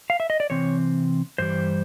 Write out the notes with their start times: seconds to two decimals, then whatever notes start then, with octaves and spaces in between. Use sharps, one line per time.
0.10 F5
0.20 E5
0.30 D#5
0.40 D5
0.50 C3 E3 C4 C#5
1.38 G2 E3 G3 C5